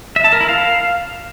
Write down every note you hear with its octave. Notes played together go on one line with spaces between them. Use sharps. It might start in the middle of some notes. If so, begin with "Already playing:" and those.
E5
A5
A#4
E4
F5